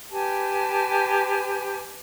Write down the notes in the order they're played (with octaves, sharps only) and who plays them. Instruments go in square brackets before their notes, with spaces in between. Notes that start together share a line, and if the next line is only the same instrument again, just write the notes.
[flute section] G4 B4 G#5 A5